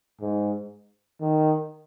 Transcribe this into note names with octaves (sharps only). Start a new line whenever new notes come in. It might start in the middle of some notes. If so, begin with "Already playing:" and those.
G#2
D#3